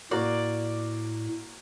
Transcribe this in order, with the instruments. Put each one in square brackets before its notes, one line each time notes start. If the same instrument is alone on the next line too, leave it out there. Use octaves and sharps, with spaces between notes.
[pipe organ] A2 [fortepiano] A#3 F#4 [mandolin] D5